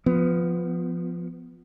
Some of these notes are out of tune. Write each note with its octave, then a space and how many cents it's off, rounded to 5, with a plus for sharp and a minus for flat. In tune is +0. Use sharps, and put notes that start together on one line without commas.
F3 +0 B3 +15